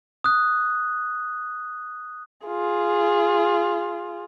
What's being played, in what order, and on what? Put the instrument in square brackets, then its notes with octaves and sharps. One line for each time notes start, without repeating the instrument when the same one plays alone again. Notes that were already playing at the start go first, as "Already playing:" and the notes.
[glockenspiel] D#6 F#6
[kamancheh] F4 G#4